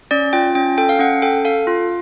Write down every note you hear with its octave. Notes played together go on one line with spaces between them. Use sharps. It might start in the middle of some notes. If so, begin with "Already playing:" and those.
C#4 D5
F4 G5
C#4 G5
A4 G5
F5
C#4 F#5
A4 G5
A4 F5
F4